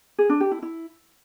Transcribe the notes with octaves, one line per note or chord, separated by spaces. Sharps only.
G#4
D4
G4
E4
E4